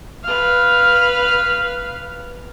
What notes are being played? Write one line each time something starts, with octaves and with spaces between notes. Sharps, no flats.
B4 F5